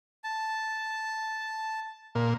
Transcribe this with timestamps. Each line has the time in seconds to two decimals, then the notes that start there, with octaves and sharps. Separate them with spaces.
0.24 A5
2.15 A#2